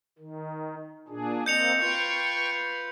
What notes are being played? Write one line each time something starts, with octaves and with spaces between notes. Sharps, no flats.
D#3
A#2 D4 G#4
A#3 C4 D#5 G6 C#7 F7
F4 B4 G5 C#6